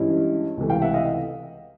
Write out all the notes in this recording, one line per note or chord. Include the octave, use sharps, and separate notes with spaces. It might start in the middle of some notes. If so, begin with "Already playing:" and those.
Already playing: G2 E3 G#3 C#4 E4
C#2 C3 E3 A3
F5 G5
E5 F#5
D#5 F5